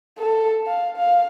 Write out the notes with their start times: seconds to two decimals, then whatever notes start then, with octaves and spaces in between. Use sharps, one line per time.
0.19 A4
0.67 F5
0.96 F5